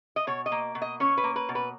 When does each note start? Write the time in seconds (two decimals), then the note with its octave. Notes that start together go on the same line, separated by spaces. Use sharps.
0.16 D#5
0.27 B2 C#5
0.46 D#5
0.52 A#3
0.75 B2
0.82 D#5
1.00 C#4 C#5
1.17 B4
1.24 A#3
1.36 B4
1.49 B2
1.55 B4